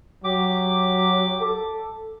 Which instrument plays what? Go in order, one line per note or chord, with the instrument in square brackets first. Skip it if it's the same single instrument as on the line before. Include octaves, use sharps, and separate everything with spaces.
[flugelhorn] F#3 [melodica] G4 D6
[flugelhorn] A4